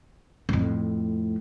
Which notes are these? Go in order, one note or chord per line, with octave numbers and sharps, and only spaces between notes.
F2 A2